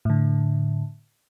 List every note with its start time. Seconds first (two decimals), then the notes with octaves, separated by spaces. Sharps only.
0.05 A2 D3